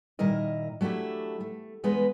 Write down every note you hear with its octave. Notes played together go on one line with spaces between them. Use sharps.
A#2 D#3 G3 E4 A#4 D#5
F#3 A3 D4 E4 G4
A3
E2 G#3 B3 D#4 B4